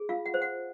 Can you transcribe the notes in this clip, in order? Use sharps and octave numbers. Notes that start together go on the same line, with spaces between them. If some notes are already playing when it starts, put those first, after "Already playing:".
Already playing: G#4
F4 F5
F#5
C5
F#5